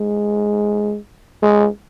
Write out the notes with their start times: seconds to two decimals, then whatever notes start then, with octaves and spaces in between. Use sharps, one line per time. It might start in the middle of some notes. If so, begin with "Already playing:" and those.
Already playing: G#3
1.42 G#3